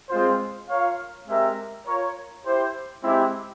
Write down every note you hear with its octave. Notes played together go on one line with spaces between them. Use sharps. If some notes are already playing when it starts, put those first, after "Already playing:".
G#3 C4 F4 C5
F4 A#4 C#5 F5
G#3 C4 G4 A#4 E5
F4 A#4 C#5
E4 G4 C5
G#3 C4 E4 G4